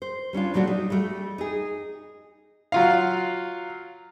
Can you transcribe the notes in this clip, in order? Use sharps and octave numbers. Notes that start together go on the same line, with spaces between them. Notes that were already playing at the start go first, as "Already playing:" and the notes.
C5
G3 C#4 D4 F4
A#2 F#3 G3 A3 D4 F#4
D#4
G3 A3
D#4 G#4
F#3 F4 F5